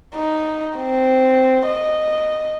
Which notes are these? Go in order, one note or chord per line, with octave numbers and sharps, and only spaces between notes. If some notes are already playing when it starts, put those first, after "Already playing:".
D#4
C4
D#5